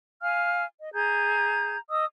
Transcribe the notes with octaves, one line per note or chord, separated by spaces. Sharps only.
F5 G#5 F6
D#5
G#4 A#5 G6 G#6
D#5 D#6 E6